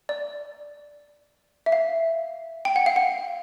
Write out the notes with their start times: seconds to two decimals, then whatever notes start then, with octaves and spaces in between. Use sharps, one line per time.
0.09 D5
1.66 E5
1.72 F5
2.65 G5
2.76 F#5
2.86 F5
2.96 F#5